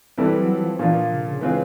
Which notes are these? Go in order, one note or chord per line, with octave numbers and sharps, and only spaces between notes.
E3 G3 C4 E4 A4
F#3
F3
A#2 E3 F3 A#3 D4 F4
C#3
C#3
E3 G#3 C4 F4 G#4